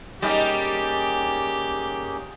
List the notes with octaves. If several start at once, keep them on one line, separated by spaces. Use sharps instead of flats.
G3 A#3 C#4 D#4 G4 G#4